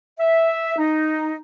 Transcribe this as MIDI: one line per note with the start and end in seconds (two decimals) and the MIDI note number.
0.19 0.77 76
0.78 1.37 63